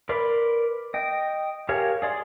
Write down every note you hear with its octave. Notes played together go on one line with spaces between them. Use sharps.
A#4 B4 D5 B5 C6
D#5 G5
G4 G#4 A#4 C#5 F5
G#4 D5 C6